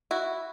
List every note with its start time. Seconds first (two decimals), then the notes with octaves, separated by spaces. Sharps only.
0.11 E4 F#4